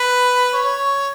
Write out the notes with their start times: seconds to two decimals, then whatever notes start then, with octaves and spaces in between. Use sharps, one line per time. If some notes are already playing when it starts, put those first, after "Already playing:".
Already playing: B4
0.54 C#5